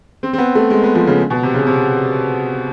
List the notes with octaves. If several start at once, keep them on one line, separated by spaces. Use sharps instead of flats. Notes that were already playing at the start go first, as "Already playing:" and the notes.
C4
C4
B3
A3
G#3
B3
F3
C#3
B2
C3
C#3
C3